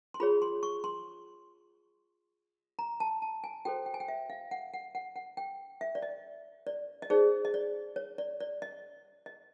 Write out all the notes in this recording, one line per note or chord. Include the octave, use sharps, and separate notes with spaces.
C6
F4 G#4 C#5 B5
C6
C#6
C6
A#5
A5
A5
G#5
F#4 A4 C5 G5
G5
G#5
G5
E5
F5
F#5
F#5
F#5
F#5
G5
E5
D5
D#5
D5
D#5
D#4 G#4 C5 D5
D#5
D5
C#5
D5
D5
D#5
D#5